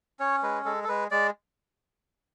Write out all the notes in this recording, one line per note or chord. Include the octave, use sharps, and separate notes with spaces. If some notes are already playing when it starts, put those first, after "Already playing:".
C#4 C#5
G#3 B4
G#3 A4
A4
G#3 B4
G#3 D5